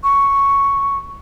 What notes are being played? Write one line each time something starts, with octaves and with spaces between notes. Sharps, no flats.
C#6